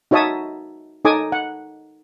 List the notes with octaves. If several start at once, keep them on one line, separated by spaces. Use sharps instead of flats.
D#4 F#4 C#5 E5 A5 D#6
D#4 A4 C#5 G#5 D6 D#6
F#5